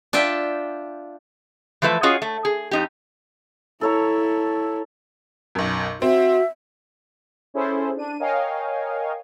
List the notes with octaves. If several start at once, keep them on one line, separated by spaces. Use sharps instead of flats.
D4 F4 D5 E5 G5
E3 F3 A3 B4 E5
C#4 F4 F#4 G#4 C#5 D#5
A3
G#4
F2 D#4 G4
E4 A4 C#5 A#5
B1 F#2
C4 F#4 E5
C#4 E4 G#4 A4 C5
D4 D#7
A#4 C#5 D#5 F5 G5 G#5